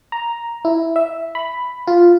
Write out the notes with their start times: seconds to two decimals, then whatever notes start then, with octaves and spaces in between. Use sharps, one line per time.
0.12 A#5
0.65 E4
0.96 E5
1.35 B5
1.87 F4